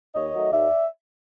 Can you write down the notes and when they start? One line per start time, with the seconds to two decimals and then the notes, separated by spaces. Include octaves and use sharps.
0.15 D#2 C#5 D#5
0.33 D#3 F#3 A3
0.52 D#2 D5 E5